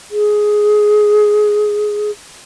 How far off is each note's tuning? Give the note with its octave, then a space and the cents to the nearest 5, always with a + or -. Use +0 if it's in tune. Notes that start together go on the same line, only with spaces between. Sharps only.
G#4 +10